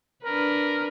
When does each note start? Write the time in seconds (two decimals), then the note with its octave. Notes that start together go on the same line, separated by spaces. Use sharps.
0.24 D4 A#4 B4